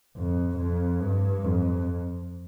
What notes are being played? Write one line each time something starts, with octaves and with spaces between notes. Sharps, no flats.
F2
F2
G2
F2